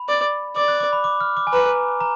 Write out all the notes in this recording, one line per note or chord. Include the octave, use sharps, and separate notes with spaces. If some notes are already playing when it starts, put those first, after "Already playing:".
Already playing: B5
D5
D5 D6
F#6
D6
B5
D6
F6
D6
G#5
B4 A#5
A#5